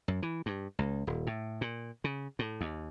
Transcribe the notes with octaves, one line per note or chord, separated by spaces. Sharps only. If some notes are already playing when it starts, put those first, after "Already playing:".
F#2
E3
G2
C#2
D#1
A2
A#2
C#3
A2
D#2